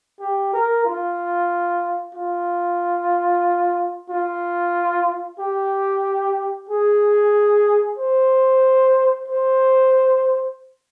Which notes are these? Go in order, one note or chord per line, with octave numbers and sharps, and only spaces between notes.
G4
A#4
F4
F4
F4
G4
G#4
C5
C5